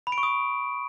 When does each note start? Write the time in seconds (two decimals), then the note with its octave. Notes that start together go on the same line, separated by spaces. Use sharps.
0.07 B5
0.12 D7
0.18 C#6
0.23 D#6